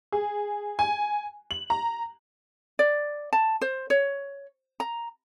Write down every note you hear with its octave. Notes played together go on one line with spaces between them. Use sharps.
G#4
G#5
F#7
A#5
D5
A5
C5
C#5
A#5